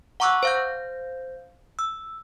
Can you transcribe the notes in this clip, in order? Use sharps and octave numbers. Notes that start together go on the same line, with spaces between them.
F#5 A#5 C#6 D6 E6 F#6
C5 F5 G6
E6